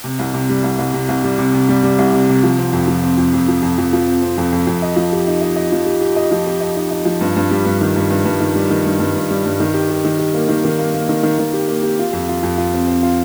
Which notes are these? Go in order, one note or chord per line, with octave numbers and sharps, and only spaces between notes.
C3
C2
C3
G3
C2
C2
C3
C2
G3
C3
C3
G3
G3
C2
C3
C3
F3
C4
F2
F3
C4
F2
F2
F3
F2
F2
F3
C4
C4
F2
F2
F2
D#5
F3
G4
D#4
D#5
D#5
F3
G4
G4
D#5
F3
G4
D#5
D#4
D#4
F3
G2
G2
G3
G2
D#3
G2
G2
G2
D#3
G3
D#3
G2
G2
G2
G3
G2
D#3
G4
G4
D#3
G4
A#3
D#3
D#3
A#3
A#3
D#3
D#3
D#3
G4
A#3
G4
F4
F2
F4
F2
F4
C4
C4
F4